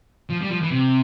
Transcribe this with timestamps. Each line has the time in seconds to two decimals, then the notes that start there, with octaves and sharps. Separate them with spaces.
0.30 F3
0.41 G3
0.50 F3
0.62 E3
0.71 C3